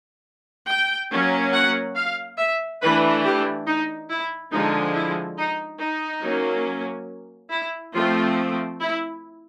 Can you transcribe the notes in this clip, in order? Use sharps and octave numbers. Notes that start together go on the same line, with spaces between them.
G5
F#3 A#3 C#4
F#5
F5
E5
E3 A3 D4 B4
G4
D#4
E4
D3 F3 G#3 D#4
E4
D#4
D#4
F#3 A#3 C#4
E4
F3 A3 C4 F4
E4